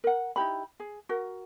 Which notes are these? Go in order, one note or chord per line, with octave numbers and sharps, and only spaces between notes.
A#4 F#5
D#4 E4 G4 B5
G#4
F#4 A#4